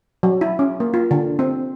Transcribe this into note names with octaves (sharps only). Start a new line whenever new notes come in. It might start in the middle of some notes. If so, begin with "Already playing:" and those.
F#3
E4
C#4
A#3
F4
D3
C4